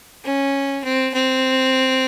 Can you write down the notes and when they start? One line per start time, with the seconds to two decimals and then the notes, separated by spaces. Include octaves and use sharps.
0.24 C#4
0.84 C4
1.14 C4